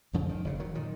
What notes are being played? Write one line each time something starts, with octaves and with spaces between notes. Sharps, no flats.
F#1 F2 C#3 F3
D#3
F#1 F2 C#3
D#3 F#3
A#2 D#3